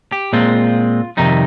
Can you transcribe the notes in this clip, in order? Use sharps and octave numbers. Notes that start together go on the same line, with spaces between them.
G4
A#2 G#3 C4 F4
F2 C3 D#3 G3 D#4